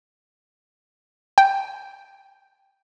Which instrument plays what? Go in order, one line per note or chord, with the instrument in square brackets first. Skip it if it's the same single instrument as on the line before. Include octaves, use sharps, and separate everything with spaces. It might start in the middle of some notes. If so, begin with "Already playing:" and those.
[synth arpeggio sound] G5